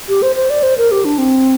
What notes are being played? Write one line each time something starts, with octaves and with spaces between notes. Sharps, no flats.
G4
C5
C5
D5
C5
A#4
G4
D4
C4